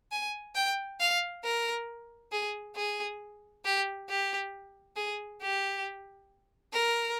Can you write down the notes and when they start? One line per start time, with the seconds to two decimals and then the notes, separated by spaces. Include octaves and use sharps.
0.12 G#5
0.55 G5
1.00 F5
1.44 A#4
2.32 G#4
2.76 G#4
3.65 G4
4.09 G4
4.96 G#4
5.41 G4
6.73 A#4